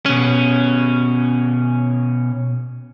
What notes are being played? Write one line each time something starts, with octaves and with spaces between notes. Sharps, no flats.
B2 C#4